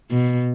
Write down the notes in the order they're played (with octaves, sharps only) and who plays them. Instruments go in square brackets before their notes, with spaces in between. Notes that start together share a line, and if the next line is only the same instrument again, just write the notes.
[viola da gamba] B2